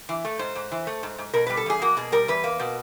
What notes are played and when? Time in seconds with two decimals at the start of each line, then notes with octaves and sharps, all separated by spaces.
0.09 E3
0.25 A3
0.39 G#2 C5
0.55 G#2
0.72 E3
0.87 A3
1.03 G#2
1.18 G#2
1.34 B2 A#4
1.46 G3 B4
1.57 A4
1.66 E2 G#4
1.82 A#3 F#4
1.97 B2 G#4
2.12 G3 A#4
2.28 E2 B4
2.44 A#3
2.60 B2